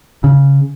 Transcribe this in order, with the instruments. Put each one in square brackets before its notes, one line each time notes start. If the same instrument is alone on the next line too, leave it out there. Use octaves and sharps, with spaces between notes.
[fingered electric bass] C#3